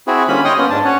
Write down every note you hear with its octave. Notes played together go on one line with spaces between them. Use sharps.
C4 E4 F#4 G#4
D3 G3 A#3 C#4 F4 B5
C#5 D#5 G5 C6 D#6
A#3 B3 C#4 F4
G#2 D4 A5
C#4 C#5 F#5